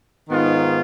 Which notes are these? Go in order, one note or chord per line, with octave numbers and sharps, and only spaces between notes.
G#2 D#3 B3 F4